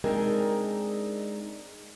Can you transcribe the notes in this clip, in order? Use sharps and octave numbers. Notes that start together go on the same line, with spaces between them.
G#3 C4 D4 D#4 G#4 A#4